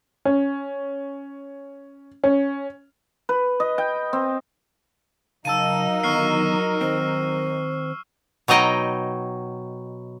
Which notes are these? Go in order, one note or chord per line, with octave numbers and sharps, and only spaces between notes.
C#4
C#4
B4
D#5
G5
C4
C#3 F#3 D#4 A#4 F5 A5 E6 D#7
D3 D#3 B3 C#6 F6 C7
D#3 C4 C5
B2 F#3 D#4 D#5 G5